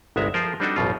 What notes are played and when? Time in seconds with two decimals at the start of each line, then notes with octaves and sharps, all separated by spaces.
0.16 G1 C2 G#3 B3 E5 A#5
0.34 F3 F4 G#4 A#4 C5
0.60 G3 C4 D4 D#4 F#4 A4
0.76 A1 F#2 B2 F4